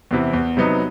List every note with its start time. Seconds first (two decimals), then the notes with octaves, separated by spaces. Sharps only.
0.11 E2 C3 E3
0.33 E2
0.57 C3 F#3 B3 D#4